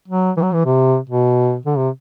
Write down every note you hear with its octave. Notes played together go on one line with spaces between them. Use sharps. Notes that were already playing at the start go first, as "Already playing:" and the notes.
F#3
E3
F#3
E3
C3
B2
D3
C3